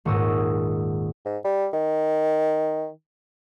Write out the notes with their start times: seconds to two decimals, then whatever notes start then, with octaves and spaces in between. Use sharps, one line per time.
0.05 D#1 G#2 C#6 D#6 E6 A#6
1.26 G#2
1.45 G3
1.73 D#3